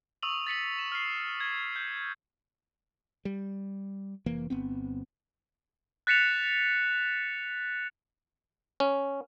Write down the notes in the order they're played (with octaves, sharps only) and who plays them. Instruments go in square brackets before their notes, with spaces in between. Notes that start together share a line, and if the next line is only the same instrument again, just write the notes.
[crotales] C#6 D#6 E6 D#7 F7 F#7
A6 B6 C#7 F#7
E7
F6 C7
G#6
G6
[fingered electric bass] G3
F1 E3 A#3
G1 B3 C4
[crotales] F#6 A6 B6 C#7 E7 F7
[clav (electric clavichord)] C#4